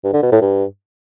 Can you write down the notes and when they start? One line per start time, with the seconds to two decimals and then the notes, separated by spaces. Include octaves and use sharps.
0.04 G2
0.13 D3
0.22 B2
0.32 A2
0.41 G2